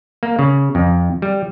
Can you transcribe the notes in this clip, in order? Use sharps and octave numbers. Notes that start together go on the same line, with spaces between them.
A#3
C#3
F2
G3